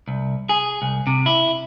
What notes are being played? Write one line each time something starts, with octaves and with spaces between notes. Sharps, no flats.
C2
G#4
C2
C3
E4